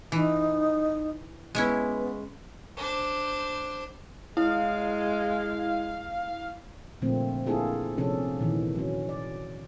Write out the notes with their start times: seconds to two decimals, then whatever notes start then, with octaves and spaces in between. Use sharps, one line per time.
0.12 E3 D#4
1.55 G#3 B3 C#4 E4
2.77 D4 C5
4.37 G#3 E4 F5
7.02 A#2 D3 F3 A3 A#3 C4
7.47 A#3 D4 E4 F4 G#4 A4
7.98 C3 F3 C#4 D4 G#4 A4
8.39 A#2 D#3 E3
8.75 F#3 C#4
9.09 D5